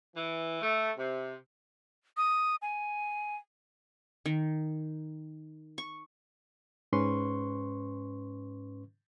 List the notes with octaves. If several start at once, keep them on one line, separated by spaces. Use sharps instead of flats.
E3
A3
C3
D#6
G#5
D#3
C#6
G#2 C#4 B4 C6 C#6